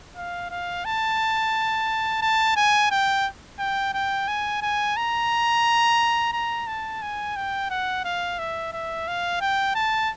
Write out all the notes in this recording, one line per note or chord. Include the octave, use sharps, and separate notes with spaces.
F5
F5
A5
A5
G#5
G5
G5
G5
G#5
G#5
A#5
A#5
A5
G#5
G5
F#5
F5
E5
E5
F5
G5
A5